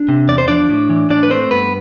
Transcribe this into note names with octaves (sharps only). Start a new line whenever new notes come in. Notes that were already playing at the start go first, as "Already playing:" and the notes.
Already playing: D4
C3
E2 D5
C5
F3 D4 D5
A2
E3
A2 D4 D5
B4
A3 C4 C5
G2 B3 B4